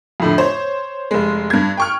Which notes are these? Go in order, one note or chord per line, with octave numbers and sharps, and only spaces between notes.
F2 A2 D3
C5 C#5
F1 G#3
G2 G#6
G5 C#6 F6